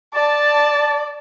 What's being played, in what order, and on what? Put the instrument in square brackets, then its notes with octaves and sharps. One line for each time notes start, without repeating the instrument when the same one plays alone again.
[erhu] D5 [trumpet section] A5